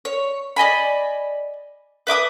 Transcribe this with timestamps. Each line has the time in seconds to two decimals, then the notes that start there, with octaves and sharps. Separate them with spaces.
0.05 C#5
0.56 D5 D#5 G#5 B5
2.07 B4 E5 D6 D#6